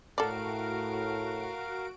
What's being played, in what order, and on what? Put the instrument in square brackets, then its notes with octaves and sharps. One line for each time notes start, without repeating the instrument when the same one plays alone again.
[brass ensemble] A2 [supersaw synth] F#4 D7 [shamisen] A4 D5 [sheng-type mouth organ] A#4 F5